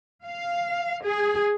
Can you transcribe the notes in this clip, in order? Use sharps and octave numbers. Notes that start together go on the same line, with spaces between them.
F5
G#4